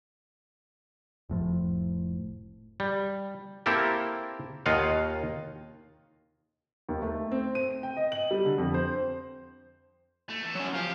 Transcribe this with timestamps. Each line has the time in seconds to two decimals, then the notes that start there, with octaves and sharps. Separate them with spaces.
1.29 F1 A2 F3
2.80 G3
3.66 A#3 C4 E4 G4 A4 A#4
4.66 D#2 D#3 F4 D#5 F5 F#5
6.89 D#2
7.02 A3
7.31 C4
7.55 D#7
7.83 G5
7.97 D#5
8.12 F#7
8.31 G3
8.45 D3
8.58 F2
8.74 C5
10.30 A3
10.43 E3 A4
10.55 F#3 C#4
10.74 F3 G4 F5